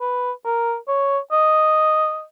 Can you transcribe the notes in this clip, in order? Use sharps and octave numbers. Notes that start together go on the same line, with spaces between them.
B4
A#4
C#5
D#5